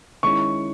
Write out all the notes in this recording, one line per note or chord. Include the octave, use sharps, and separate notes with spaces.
D#3 G#3 C#4 E4 C#6